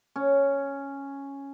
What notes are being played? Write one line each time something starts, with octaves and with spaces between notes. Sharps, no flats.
C#4